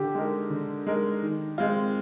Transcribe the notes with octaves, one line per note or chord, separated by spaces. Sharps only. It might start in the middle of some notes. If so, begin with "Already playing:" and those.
Already playing: D3 G4
G#3 D#4 A#4
D3
G#3 D#4 A#4
D#3
G#3 C4 F4